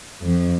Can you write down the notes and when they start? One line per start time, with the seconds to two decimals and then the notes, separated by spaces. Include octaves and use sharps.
0.23 F2